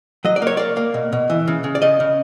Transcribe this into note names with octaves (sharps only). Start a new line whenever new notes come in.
F#3 D#5
D5
A#3 C#5
A#3 D5
A#3
B2
B2
E3
C#3
C#3
D5
C#3 D#5
C#3